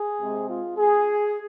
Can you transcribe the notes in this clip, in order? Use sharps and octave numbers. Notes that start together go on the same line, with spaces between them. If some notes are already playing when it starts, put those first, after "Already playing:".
Already playing: G#4
C3 G#3 C4
F4
G#4